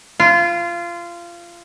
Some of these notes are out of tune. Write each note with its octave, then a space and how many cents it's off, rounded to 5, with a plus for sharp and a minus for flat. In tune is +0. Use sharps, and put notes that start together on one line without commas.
F4 -20